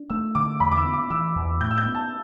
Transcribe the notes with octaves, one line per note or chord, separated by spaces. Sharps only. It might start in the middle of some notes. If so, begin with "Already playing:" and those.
Already playing: D4
A3 E6
D3 D6
E2 B5
D6
E6
B3
D6
E3 E6
E2
A2 G6
E6
G6
B3
A5